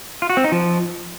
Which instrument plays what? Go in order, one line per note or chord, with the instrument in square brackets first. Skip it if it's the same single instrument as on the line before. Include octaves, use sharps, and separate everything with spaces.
[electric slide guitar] F4
F#4
C4
D#4
F3